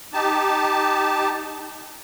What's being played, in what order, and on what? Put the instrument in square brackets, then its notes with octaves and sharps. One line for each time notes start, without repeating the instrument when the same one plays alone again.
[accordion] D#4 G4 A5